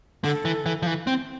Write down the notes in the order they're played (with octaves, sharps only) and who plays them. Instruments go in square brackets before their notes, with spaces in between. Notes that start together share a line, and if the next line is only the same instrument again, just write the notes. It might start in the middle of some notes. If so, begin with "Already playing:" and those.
[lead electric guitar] D3 [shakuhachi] A4
[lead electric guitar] E3
E3
F3
E3
C4